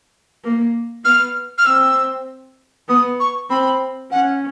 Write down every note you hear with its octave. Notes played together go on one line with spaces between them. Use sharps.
A#3
B3 F6
F6
C4 E6
B3 D#6
C#6
C4 B5
C#4 F#5